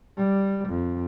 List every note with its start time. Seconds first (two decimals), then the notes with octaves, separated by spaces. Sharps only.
0.17 G3
0.69 F2